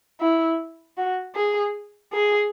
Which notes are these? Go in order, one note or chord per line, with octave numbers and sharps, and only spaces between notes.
E4
F#4
G#4
G#4